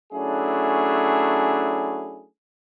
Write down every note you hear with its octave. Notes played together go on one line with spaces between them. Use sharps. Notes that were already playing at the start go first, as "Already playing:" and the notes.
F#3 A3 C#4 D4 E4 G#4